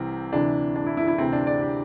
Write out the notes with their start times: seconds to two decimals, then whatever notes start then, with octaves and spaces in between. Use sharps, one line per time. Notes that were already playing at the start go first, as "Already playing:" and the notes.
Already playing: C2 C3 E3 C4
0.32 D2 C3 E3 D4
0.76 D4
0.86 E4
0.97 E4
1.08 E4
1.18 D2 C3 E3 C4
1.33 D4
1.47 D5
1.61 G4